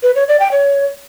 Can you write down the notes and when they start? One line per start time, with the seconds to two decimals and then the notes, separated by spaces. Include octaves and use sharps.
0.03 B4
0.15 C#5
0.28 D5
0.40 G5
0.52 C#5